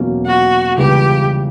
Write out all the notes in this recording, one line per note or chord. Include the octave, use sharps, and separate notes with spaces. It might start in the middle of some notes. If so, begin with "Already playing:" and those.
Already playing: E2 B2 F#3 A#3 C#4
F#4
C#2 C#3 E3 G3 B3 G4